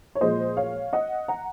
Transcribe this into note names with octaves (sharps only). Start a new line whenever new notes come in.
C#5
A#2 F3 G#3 C5 D#5
C#5 F5
D#5 F#5
F#5 A#5